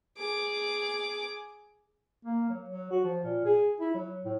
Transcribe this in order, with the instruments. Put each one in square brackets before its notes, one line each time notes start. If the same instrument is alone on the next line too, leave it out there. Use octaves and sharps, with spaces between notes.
[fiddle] G#4 D6
[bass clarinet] A#3
F#3
F#3
F#4
F3
A#2
G#4
E4
F#3
A2